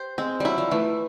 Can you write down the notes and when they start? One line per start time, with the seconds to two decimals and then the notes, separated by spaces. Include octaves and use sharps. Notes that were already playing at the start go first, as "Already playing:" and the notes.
Already playing: G4 C5
0.18 G#3 C4
0.40 F#3 G3 E4
0.58 F3
0.71 E3 A3